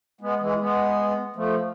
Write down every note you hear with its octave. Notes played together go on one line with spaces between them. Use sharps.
G#3 B3
E3 G#3
G#3 B3
F3 A3